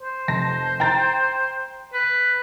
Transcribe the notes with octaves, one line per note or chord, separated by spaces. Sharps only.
C5
F1 A5 A#6
G5 A#5 A6
B4